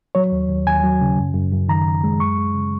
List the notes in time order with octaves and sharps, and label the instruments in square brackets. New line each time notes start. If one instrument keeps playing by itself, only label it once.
[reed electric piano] F#3 C#5
D#2
D#2
D#2 G#5
F#3
C#3
F#2
F#2
F#2
D#3 A#5
F#2
G#3
F#2 C#6
G#3
C#3